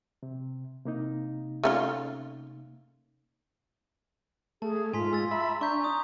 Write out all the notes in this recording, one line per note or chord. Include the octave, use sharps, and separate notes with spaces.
C3
C3 A#3 D#4
A3 C#4 F4
A3 G#4 A5
G#2 F4 G#5 C6 B6
G#3 E6 A6
E5 A#5 B5
D4 A#5 C#6 G6
G#5 D#6